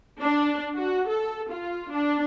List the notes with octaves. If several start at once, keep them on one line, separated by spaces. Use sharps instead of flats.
D4
F#4
A4
F4
D4